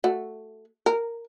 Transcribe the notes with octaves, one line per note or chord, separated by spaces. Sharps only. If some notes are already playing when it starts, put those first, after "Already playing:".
A3 F#4
A#4